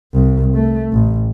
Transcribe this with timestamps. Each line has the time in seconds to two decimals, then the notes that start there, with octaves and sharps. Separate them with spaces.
0.14 C2
0.55 A3
0.93 A1